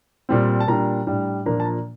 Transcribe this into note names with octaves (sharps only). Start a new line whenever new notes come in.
A#2 G3 C4
A5
A#2 G3 D4 A#5
A2 G3 D4
A#2 F3 A#3 D4 A#5
A5
A#5